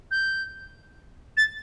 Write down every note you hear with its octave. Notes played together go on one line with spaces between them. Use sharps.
G6
A6